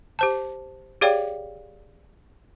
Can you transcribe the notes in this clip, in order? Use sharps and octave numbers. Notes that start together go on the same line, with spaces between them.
G4 C5 A5
G4 G#4 C#5 D5 F5 G5